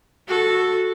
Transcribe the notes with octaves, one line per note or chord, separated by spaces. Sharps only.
F#4 A4